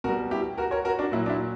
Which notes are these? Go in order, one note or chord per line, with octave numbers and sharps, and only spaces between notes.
B2 G3 F#4 A#4
E4 G4
F#4 A#4
A#4 C#5
F#4 A#4
D4 F#4
A#2 F#3 E4
D4
E4